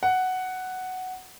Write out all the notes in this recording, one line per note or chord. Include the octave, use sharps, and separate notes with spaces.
F#5